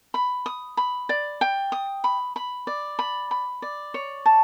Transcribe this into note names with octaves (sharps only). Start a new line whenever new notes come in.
B5
D#6
B5
D5
G5
D#6
B5
B5
D5
B5
B5
D5
C#5
A5